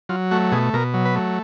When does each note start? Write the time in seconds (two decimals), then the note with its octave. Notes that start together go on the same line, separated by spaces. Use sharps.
0.09 F#3 F4
0.31 A3 F#4
0.52 B2 G#4
0.73 B2 A#4
0.94 F#3
1.05 B4
1.15 A3